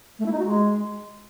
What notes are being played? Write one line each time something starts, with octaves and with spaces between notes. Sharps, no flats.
A3
E4
D#4
F#4
G#3